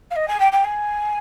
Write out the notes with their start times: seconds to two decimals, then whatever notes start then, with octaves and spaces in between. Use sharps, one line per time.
0.11 F5
0.16 D#5
0.28 G#5
0.40 G5
0.52 G5
0.64 G#5